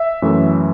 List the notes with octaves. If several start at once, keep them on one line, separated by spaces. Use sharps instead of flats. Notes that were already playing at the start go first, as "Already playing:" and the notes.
Already playing: E5
F#2 E3 A3